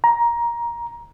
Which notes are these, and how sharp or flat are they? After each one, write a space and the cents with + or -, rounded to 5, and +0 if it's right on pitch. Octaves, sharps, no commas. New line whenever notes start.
A#5 +15